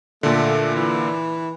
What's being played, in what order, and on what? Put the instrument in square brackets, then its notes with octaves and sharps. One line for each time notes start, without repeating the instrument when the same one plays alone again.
[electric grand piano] A#2 D3 [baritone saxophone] A3
[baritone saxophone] E3